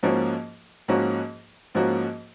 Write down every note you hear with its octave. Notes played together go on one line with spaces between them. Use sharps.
G#2 F3 A#3 C#4 F#4
G#2 F3 A#3 C#4 F#4
G#2 F3 A#3 C#4 F#4